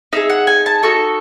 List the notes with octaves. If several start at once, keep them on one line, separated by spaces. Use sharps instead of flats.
D#4 G#4 E5
F#5
G#5
A5
D#4 F#4 A4 C#6